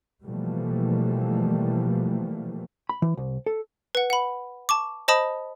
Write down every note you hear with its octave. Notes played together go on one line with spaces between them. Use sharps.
B2 E3 F3 G3 A3 A#3
B5
E3
C2
A4
B4 F#5
F#5 B5
A5 C#6 D6
C5 D#5 A5 B5 D#6